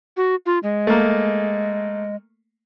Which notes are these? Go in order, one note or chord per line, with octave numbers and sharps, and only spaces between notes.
F#4
F4
G#3
A3 A#3